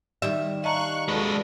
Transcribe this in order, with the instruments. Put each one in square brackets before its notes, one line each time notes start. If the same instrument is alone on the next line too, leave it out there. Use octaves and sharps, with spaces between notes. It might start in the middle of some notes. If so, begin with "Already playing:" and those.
[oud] D#3 G3 E5
[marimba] D#5 A5 A#5 [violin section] F5 C#6 F#6
[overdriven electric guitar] G#3 B4 [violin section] F#4 A4 D5